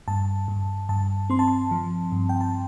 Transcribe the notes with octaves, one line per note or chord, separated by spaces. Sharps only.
G2 A5
G2
G2 A5
C4 C6
A5
C6
F3
G2
G5
A5